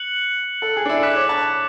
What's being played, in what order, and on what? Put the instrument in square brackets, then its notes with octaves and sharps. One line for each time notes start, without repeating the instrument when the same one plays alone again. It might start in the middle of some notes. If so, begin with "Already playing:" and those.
Already playing: [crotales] F#6 C#7 F#7
[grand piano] A4
G#4
D4
E4
[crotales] D6 F#6 B6
[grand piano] C#5
A5